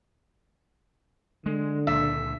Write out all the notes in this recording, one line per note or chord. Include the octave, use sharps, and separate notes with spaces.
D3 G#3
C#2 A#2 D4 E5